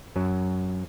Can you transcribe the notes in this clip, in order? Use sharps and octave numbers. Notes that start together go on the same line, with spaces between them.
F#2 F#3